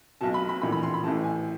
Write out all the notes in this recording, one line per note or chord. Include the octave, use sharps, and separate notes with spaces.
B1 B2 A5
B5
B5
A#1 A2 E3 B5
B5
C6
B5
A1 A2 E3 A5
G#5